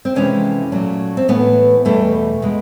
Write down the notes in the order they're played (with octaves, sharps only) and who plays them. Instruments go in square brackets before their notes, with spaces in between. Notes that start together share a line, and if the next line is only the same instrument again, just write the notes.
[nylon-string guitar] C4
F2 C3 E3 G#3 C#4
A#2 F#3 A3
C4
A2 E3 A3 B3
E2 B2 G3 A3
B2 G#3